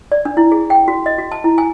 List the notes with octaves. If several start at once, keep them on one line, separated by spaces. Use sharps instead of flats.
D5
D4
E4
G#4
G5
F#4
D#5
F#4
A5
E4
G#5